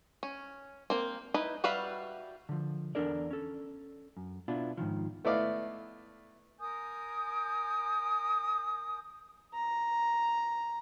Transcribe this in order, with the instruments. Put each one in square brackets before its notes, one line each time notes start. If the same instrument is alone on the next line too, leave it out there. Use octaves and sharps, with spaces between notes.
[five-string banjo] C#4
A#3 C4
D#4 E4 B4
G3 F#4 B4 E5 F5
[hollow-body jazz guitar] D3 F3
E2 D4 A4 A#4 D5
C#4 A4
F#2
B2 B3 D4 E4 F4
G#2 B2 D#3 F3
[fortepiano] A3 B3 E4 D5 D#5 F5
[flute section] A#4 G#5 D#6 G6
[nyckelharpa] A#5